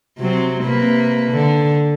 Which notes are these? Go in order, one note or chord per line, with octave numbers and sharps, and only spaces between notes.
C3 F#3 C4
C3 A#3 B4
D3